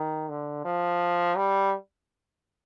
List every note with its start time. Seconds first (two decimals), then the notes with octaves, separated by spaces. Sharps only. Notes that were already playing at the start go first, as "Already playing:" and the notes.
Already playing: D#3
0.29 D3
0.65 F3
1.37 G3